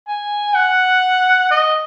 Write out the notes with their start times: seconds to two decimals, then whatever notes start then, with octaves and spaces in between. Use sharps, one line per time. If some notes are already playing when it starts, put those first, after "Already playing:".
0.07 G#5
0.55 F#5
1.51 D#5